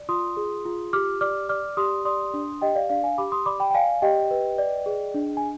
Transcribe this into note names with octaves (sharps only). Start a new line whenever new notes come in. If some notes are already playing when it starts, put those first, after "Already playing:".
Already playing: D5
F4 C6 D#6
G#4
F4
G4 D6 F6
D5 D6 F6
D5 D6 F6
G4 C6 D#6
D5 C6 D#6
D4
G4 D#5 G5
D5 F5
D4 D5 F5
F5 G#5
G4 B5 D6
C6 D#6
D5 B5 D6
G5 B5
G5
D5 F5 G#5
G4 D#5 G5
B4
D5
G#4
D4
G#5